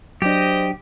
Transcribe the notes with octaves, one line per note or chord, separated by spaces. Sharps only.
F#3 D4 G4 C5 D#5